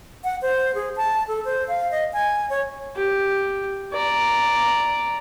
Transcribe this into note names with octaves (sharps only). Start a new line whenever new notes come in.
F#5
C5
G#4
A5
A4
C5
F5
D#5
G#5
C#5
G4
D5 A#5